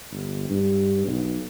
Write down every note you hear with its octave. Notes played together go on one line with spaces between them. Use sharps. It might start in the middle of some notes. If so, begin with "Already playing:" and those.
G1
G2
B1